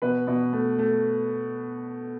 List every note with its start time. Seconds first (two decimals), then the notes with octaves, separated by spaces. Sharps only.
0.02 B2 B4
0.27 B2
0.53 A3
0.79 A3